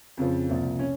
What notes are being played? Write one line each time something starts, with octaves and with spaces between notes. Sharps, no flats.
F2 C#3 F3
C2 A#2 F3
C#4